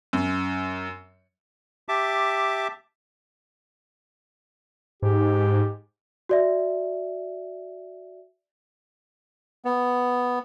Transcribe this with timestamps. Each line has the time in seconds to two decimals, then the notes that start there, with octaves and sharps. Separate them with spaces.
0.13 F#2
1.89 G4 E5 A5 D6
5.02 G#2 G4
6.29 F#4 D5 E5
9.65 B3